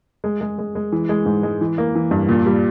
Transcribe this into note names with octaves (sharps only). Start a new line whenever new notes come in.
G#3
G#3
G#3
G#3
E3
G#3
G#2
G#3
E3
A#3
E3
G2
A#2
G3